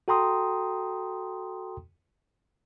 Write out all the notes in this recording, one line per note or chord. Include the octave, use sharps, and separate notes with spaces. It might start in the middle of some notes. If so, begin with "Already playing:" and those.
F#4 A4 G5 A#5 C6 D#6